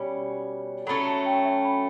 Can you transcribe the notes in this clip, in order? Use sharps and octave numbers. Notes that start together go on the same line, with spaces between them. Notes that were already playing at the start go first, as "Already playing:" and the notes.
Already playing: B2 G3 C#4 C#5
F#3 A3 C#4 B5
A5
G5
E5
B5